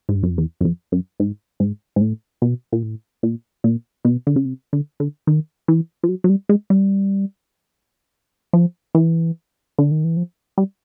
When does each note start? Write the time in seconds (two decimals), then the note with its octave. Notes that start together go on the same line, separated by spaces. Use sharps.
0.09 G#2
0.16 G2
0.23 F#2
0.30 F2
0.38 E2
0.61 F#2
0.65 F2
0.92 F#2
1.20 G#2
1.60 G#2
1.96 G#2
2.01 A2
2.42 B2
2.72 A#2
2.83 A2
3.23 A#2
3.64 A#2
4.05 B2
4.27 D3
4.36 C#3
4.45 C3
4.73 D3
5.00 D3
5.27 D#3
5.68 E3
6.03 F3
6.09 F#3
6.24 F#3
6.29 G3
6.49 G#3
6.70 G3
8.53 F3
8.95 E3
9.79 D3
9.91 D#3
10.04 E3
10.17 F3
10.58 G3